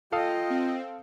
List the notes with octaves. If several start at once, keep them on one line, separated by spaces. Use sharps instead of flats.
F4 A4 D#5 F5 G5 D#6
C4